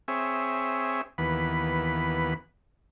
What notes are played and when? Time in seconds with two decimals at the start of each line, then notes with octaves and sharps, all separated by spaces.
0.08 C4 G#4 C#5 E5
1.18 D#2 E3 B3 B5